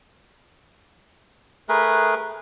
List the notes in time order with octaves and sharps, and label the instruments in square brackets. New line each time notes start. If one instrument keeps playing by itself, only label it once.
[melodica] A3 G#4 A#4 B4